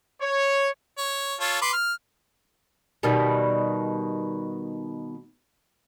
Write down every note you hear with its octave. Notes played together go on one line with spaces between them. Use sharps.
C#5
C#5
F4 A4 C#5
B4 C6 D6
F6
B2 D#3 G3